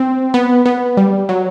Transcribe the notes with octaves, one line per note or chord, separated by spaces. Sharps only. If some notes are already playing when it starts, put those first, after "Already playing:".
Already playing: C4
B3
B3
G3
F#3